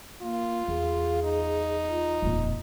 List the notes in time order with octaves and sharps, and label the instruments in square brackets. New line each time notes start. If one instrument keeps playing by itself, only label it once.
[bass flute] A#3 [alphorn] F4
[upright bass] E2 [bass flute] G#4
[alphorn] D#4
[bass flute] F4
[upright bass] D#1 F2